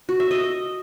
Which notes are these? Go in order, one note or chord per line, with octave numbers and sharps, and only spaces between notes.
F#4
E5
D#5